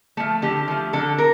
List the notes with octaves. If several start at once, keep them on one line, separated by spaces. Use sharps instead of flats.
F3 A3
D3 G4
F3 A3
D3 A4
A#4